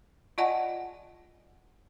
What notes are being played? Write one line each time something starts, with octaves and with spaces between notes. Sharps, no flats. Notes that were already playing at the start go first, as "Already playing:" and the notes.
F4 D5 D#5 F#5 G#5 A5